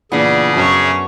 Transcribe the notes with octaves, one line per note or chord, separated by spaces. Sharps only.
A#2 C#3 E3 B3 D4 G#4
F#2 C#5 G#5 A5